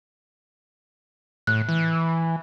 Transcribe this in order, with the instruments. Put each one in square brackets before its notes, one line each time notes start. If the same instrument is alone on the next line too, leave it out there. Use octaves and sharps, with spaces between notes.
[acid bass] A2 [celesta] F#6
[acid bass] E3